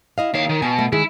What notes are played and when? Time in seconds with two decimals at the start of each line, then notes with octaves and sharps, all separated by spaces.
0.18 E4 D#5 F5
0.34 D#2 D#4 C#5 F5
0.49 D#3
0.62 B2 G#5
0.79 A3
0.92 D#3 G#3 E4 G#4